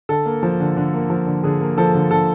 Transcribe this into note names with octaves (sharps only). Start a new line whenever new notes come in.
D3 A4
A#3
F3
D3
D3
A#3
F3
D3
D3 G#4
A#3
F3 A4
D3
D3 A4